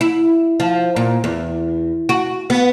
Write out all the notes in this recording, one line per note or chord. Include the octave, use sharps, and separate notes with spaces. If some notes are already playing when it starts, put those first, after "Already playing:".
E4
F3
A#2
E2
F#4
B3